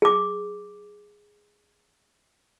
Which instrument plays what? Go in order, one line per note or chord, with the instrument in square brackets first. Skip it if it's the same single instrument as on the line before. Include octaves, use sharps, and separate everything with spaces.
[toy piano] G#4 D6